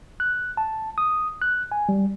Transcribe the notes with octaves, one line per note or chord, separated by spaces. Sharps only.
F#6
A5
D#6
F#6
G#5
G3